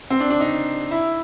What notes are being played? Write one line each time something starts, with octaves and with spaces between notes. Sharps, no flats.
C4
D4
D4
D#4
E4